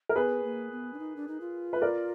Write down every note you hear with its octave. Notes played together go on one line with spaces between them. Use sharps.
A#4
B3 G#4 B4
A#3
B3
D4
D#4
D4
D#4
F4
B4
A#4 D5